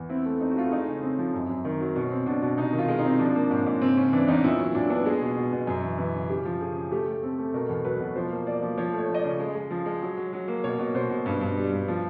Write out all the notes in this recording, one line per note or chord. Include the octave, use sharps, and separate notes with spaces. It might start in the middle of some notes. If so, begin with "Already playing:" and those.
Already playing: E2
C4 E4
A3
C4 D#4
F#4
A3 F4
E4
G#3 D#4
C#3
C#4
C#3 C4
F3
F#2
F#2
D#3
F#3
B2 C#4
C4
B2 D4
B2
C3 D#4
D#3
F4
G#3
D#4
C4
F3 D4
A#3
G#2 C#4
G#2
C#3 C4
C#3 C#4
E3 D4
E2 D#4
A#2 E4
F#3 C#4
A#2 D4
B3 D4
G#3 G#4
B2
B2
B2
F#2
E3
E3
C#3
C#3 G4
F3
C#3 G#4
C#3
A3 G4
A3
C4 A4
A3
B2 A#4
E2
F#3 B4
B2
F3 C5
A#3
A#3 D5
F3
F3 C#5
A3
C#5
F3
D#5
D5
C#3
G#3
G#3
F3
G#3
F#3
F#3
F#3
A#3
B2 C#5
B2
B2 C5
B2
G2
G2
G3
G2
F3